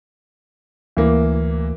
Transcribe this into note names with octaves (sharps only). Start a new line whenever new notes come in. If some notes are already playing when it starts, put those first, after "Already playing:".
D2 E3 A#3